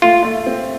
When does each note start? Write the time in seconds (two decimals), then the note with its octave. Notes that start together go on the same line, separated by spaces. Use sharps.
0.02 A3 F4
0.25 A3
0.47 C4